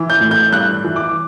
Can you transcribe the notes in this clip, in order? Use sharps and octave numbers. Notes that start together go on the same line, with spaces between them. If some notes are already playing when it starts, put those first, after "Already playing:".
Already playing: E3
G6
A2
G6
G2 F#6
E3
D6